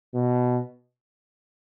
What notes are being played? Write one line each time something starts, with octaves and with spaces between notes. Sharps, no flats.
B2